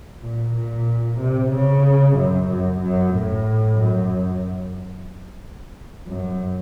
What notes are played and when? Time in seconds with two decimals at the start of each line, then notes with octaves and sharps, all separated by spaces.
0.21 A#2
0.54 A#2
1.20 C3
1.52 C#3
2.17 F#2
2.49 F#2
2.81 F#2
3.14 A2
3.79 F#2
6.07 F#2